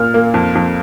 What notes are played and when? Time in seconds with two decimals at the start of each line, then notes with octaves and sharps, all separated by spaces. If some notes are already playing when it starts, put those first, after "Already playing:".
Already playing: A#2 A#3 F6
0.14 A#3
0.34 F2
0.55 F2